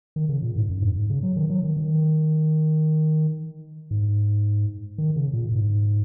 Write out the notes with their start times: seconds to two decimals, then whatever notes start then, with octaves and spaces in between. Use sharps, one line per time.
0.16 D#3
0.29 C#3
0.42 A#2
0.56 G#2
0.70 F#2
0.82 G#2
0.96 G#2
1.10 C#3
1.23 F#3
1.36 D#3
1.50 F#3
1.63 D#3
1.76 D#3
3.91 G#2
4.98 D#3
5.16 C#3
5.33 A#2
5.52 G#2